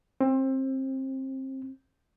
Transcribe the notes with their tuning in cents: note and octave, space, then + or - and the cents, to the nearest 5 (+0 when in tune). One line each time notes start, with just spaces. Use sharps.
C4 +25